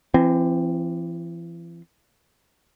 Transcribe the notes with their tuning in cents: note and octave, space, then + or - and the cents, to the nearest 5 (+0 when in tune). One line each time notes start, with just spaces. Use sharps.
E3 +40 C4 +0